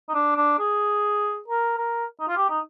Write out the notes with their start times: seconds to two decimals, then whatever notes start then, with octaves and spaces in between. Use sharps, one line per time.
0.09 D#4
0.14 D4
0.36 D4
0.59 G#4
1.48 A#4
1.78 A#4
2.20 D#4
2.28 F4
2.37 G4
2.50 D#4